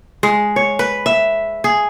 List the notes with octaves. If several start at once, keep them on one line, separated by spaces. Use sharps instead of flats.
G#3
C#5
B4
E5
G#4